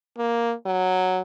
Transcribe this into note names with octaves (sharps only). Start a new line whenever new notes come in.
A#3
F#3